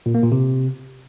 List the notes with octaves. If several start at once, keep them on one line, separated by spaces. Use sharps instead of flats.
A#2
A#3
A#2
C3